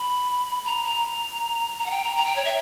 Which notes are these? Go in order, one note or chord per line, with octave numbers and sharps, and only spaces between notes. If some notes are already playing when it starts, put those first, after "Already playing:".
Already playing: B5
A#5
A#5
A#5
F#5
G5
A#5
A#5
G5
C#5
E5